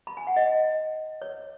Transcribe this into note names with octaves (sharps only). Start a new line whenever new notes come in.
B5
G#5
F#5
D#5
C#5